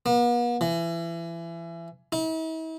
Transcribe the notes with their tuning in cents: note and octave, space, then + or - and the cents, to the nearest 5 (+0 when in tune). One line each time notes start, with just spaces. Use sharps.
B3 -45
E3 +30
E4 -45